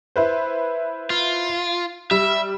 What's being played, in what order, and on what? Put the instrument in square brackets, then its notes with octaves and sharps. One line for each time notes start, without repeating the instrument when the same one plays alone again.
[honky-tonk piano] E4 B4 C5
[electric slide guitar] F4
[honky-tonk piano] G3 [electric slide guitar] E5